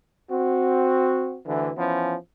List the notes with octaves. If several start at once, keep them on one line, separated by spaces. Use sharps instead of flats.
C4 F#4
D2 D3 E3
E3 F3 B3 C#4